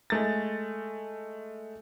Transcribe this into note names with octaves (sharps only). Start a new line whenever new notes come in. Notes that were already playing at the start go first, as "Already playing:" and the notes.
G#3 A3 A6